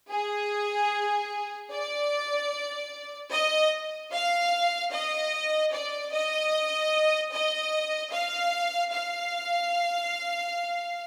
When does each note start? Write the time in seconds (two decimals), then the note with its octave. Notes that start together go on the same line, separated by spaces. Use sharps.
0.11 G#4
1.72 D5
3.31 D#5
4.12 F5
4.92 D#5
5.73 D5
6.12 D#5
7.32 D#5
8.12 F5
8.92 F5